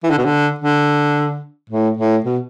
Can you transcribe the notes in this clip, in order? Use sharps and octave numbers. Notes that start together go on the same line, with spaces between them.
E3
D3
B2
D3
D3
A2
A2
B2